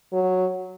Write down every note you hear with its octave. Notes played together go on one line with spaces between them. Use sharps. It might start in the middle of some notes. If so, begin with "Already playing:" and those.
F#3